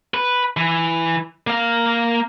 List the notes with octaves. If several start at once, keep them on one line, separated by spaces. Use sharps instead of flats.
B4
E3
A#3 F5